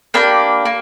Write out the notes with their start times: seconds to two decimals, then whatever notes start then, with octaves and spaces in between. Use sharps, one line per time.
0.14 A#3 D4 G4 B5
0.65 A#3